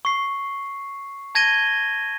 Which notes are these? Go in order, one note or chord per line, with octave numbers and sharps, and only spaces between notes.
C#6 C7
A5 G#6 A#6 D#7 G7